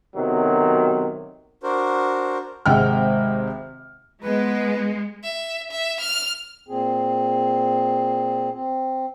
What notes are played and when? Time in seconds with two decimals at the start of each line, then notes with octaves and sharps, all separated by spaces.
0.15 B1 C3 D#3 F#3
1.63 D4 F#4 A#4 C5
2.66 G#1 C3 G#3 F#5 G5 F6
4.23 G#3 B3 B4
5.23 E5
5.71 E5
6.00 F6
6.69 A#2 C4 G#4
8.52 C4